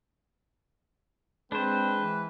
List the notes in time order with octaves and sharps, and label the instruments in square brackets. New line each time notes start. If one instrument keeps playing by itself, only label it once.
[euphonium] G#3 [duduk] C4 [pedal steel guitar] D4 C5 [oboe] B4
[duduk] E3